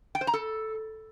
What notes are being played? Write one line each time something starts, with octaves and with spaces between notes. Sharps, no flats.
G5
C5
A#5
A4